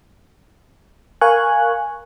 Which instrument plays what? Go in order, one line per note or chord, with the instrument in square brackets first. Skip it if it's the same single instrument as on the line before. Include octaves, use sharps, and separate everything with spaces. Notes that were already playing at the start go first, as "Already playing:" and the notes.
[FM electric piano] A#4 F5 G#5 C#6 F#6